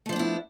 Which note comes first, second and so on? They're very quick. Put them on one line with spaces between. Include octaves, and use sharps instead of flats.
A3 F3 D4 B3 E4